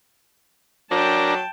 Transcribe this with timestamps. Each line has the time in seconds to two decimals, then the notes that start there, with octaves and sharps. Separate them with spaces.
0.91 F#3 D4 A#4 G5 A5